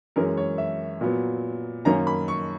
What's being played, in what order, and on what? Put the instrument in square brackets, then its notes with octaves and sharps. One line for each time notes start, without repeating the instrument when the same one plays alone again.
[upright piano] F#2 E3 G#3 C#4 A#4
C#5
E5
A#2 F#3 B3
F#2 D#3 A#3 C#4 A#5
B5
C#6